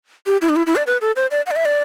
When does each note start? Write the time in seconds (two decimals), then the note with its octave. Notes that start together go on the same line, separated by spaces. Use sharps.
0.27 G4
0.42 E4
0.49 D4
0.56 E4
0.67 E4
0.76 D5
0.87 B4
1.01 A4
1.16 C5
1.31 D5
1.46 F#5
1.51 D5
1.56 E5
1.65 D5